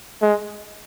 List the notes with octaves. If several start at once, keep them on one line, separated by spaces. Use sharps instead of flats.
G#3